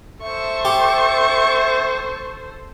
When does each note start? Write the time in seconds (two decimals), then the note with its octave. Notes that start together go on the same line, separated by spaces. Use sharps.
0.23 A4 C5 E5 C#6
0.65 G4